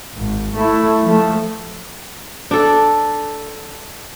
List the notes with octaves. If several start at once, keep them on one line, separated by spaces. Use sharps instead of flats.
G#1
A3 E4
F3 A3
D4 A4